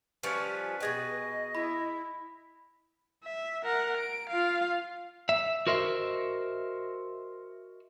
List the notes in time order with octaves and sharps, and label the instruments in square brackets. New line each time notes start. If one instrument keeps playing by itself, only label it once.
[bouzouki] F3 G3 C#4 [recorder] B4
[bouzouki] B2 G#4 G5 [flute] D#5
[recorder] E4 [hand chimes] B5
[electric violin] E5
A#4 F#5
D7
F4 F5
[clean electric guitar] E5
F#4 A#4 C5 D#5 E5